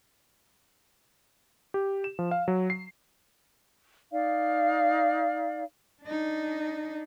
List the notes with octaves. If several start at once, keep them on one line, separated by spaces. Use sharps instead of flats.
G4
E7
F3
F5
F#3
C7
D#4 D5 F5
D4 D#4